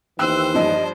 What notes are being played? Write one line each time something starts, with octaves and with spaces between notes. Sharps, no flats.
D#2 E3 C5 G5 E6 F#6
G2 F3 D#5